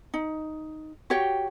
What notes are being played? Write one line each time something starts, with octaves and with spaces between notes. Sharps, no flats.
D#4
F#4 G4 C#5 G5